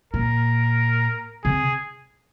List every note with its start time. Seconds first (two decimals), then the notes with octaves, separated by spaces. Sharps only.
0.14 A#2 A#4
1.44 C3 G#4